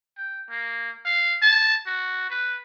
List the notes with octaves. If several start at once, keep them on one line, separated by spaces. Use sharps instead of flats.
G5
A#3
F5
A5
F#4
B4